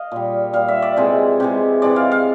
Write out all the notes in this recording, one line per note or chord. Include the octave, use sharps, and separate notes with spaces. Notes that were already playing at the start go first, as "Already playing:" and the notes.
Already playing: D#5 F5
A#2 G3
A#2 G3 F5
E5
D5
C3 E3 G#3
C3 E3 G#3
C3 E3 G#3 D5
F5
F5